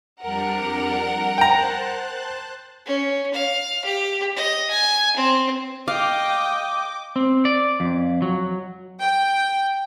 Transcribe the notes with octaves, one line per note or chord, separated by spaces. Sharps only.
F2 G3 D4 A#4 F#5
C5 G5 A5 A#5 F#6
C#4
F5
G4
D#5
G#5
C4
D#5 F5 G5 D6
C4
D5
F2
F#3
G5